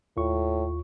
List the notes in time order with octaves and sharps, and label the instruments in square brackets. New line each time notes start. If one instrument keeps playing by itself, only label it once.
[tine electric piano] D#2 F4 C#6 [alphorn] A2